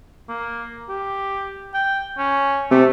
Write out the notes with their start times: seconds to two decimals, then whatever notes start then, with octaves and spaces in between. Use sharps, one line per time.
0.29 A#3
0.89 G4
1.74 G5
2.18 C#4
2.71 C3 A3